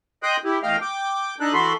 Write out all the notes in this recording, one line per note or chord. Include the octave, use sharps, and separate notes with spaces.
D#5 G5 C6 D#6 F#6 G6
E4 G4
E2 A3 D#5 F5 G5 F6
G5 D6
D4 D#4 A4 F#6
E3 F#4 A4 B5 C6